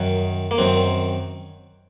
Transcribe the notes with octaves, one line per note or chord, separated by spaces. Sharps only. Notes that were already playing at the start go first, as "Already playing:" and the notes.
Already playing: F#2 D#3
A#3
F#2 D#3 C4